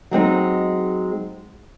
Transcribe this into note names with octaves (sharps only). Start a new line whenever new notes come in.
F#3 G#3 C4 D#4